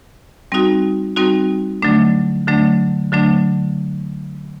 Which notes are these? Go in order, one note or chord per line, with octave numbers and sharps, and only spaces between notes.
G3 C4 D#4 F#4
G3 C4 D#4 F#4
D3 F#3 A3 D4
D3 F#3 A3 D4
D3 F#3 A3 D4